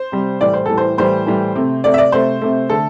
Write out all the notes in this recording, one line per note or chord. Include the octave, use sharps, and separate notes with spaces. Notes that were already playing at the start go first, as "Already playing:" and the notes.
Already playing: C5
C3 G3
A2 E3 G3 D5
C5
A2 E3 G3 A4
C5
A2 E3 G3 C5
A2 E3 G3
C3 A3
C3 A3 D5
E5
D5
C3 A3 C5
C3 A3
D3 A3 A4